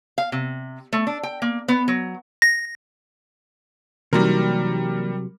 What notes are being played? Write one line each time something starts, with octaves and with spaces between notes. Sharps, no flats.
F5
C3
A3
D4
G5
A#3
B3
F#3
A#6
C3 E3 F#3 G3 A#3 D#4 A#4